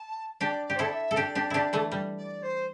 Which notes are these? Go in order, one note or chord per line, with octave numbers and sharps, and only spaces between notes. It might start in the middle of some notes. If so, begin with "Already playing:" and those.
Already playing: A5
D4 G4 D5
D5
G4
C5
E4 A4 D5
E5
A4
D4 G4 D5
D4 G4
D4 E4 G4
E3 A3
G3
D5
C5